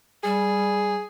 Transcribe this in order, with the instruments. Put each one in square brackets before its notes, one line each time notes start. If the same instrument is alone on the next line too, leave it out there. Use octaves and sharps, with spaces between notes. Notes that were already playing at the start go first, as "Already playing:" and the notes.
[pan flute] G3 [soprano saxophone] G#4